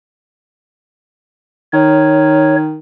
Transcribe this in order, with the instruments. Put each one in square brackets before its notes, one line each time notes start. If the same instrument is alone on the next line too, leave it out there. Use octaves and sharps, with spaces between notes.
[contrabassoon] D#3 [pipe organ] C#5